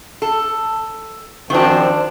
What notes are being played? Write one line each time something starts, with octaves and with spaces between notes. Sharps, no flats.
A4
F#2 D#3 F3 C4 D4